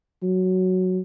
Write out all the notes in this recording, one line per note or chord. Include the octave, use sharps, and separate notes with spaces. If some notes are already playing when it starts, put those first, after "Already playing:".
F#3